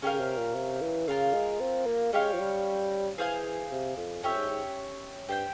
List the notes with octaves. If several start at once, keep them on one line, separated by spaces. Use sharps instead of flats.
C#3 C#4 G4 A#4 F5
C#3
C3
A#2
C3
E3
C#3 F4 A#4 F5
G#3
C4
A#3
G#3 C#4 G4 C#5 F5
F3
G3
E3 G#4 C5 F5 G#5
C3
F2
F2 C#4 G4 C#5 E5
G#2
G#2
G2 G4 C5 G5